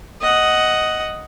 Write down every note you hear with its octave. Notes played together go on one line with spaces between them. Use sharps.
D#5 F#5